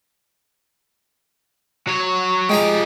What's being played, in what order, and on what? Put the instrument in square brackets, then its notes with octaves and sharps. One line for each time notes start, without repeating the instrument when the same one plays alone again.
[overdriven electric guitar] F#3 C#5
[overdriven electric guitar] F3 G4 [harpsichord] G#3 G#5 A#5